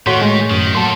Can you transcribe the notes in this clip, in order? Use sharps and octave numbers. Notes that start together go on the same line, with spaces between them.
A2 D#3 A3 F#4 C#5 C6 C#6 B6
G#3
F#2 D#3
F#3 A#3 A4 A5 C6